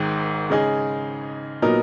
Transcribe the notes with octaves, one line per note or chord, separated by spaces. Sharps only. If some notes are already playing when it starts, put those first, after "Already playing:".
Already playing: G#1 G#2 D#3 G#3
C#3 G#3 D#4 G#4
A#2 F#3 B3 D#4 A#4